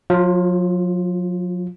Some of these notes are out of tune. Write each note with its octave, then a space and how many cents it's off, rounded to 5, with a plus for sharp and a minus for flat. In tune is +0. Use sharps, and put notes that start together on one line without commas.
F#3 -45 F4 +0